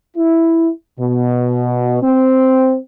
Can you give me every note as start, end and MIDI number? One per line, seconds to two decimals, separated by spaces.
0.16 0.69 64
0.99 2.01 47
2.02 2.77 60